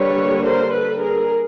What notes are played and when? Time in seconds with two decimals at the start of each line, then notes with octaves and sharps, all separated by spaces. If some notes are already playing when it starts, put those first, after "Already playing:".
Already playing: D3 G3 A#3 B4 C#5
0.45 A#4 C5
0.73 A4 B4
1.00 G#4 A#4